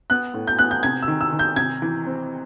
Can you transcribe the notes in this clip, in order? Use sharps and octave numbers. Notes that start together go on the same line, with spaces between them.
B3 F#6
A2
G6
B3 F#6
G6
C3 G#6
E6
D#3
E6
D#3
G6
C3 G#6
E3
C4